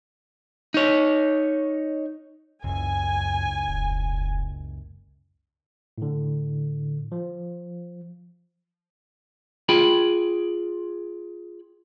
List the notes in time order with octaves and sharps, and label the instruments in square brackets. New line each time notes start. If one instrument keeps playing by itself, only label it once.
[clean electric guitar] D#4 C#5
[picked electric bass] F#1 C#2 [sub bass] F#2 [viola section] G#5
[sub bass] E1
[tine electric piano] A2 D3
F3
[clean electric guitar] F4 G#4 G5 B5